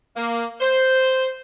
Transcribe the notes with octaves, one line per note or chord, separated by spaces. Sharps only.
A#3
C5